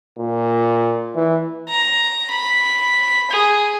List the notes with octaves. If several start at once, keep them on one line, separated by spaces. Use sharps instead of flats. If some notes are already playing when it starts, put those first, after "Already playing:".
A#2
E3
A#5
B5
G#4